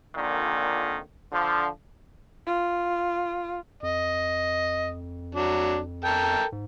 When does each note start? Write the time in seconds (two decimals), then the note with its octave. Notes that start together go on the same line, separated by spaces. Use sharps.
0.16 F2 A#2 D3 D#3
1.32 D3 F3
2.46 F4
3.83 F2 D#5
5.35 F#3 D4
6.05 A4 A#4 G5
6.52 G#2